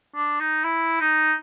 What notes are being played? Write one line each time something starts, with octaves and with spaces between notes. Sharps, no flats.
D4
D#4
E4
D#4